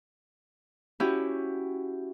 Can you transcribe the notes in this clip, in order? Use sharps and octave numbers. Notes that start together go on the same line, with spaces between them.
C#4 E4 F#4 G4